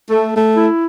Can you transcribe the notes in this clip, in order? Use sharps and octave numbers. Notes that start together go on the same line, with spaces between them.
A3
A3
E4